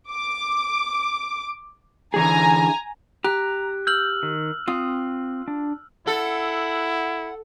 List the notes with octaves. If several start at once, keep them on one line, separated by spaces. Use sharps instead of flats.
D6
D3 E3 G#4 G#5 A#5
G4 A#5 F#6
E6 F6 G6 F#7
D#3
C4 F4 D#6
D4
E4 A4 F#5